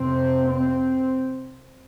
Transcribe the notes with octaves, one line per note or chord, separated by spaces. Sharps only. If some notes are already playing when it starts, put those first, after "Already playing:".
Already playing: F2 C3 C4
C4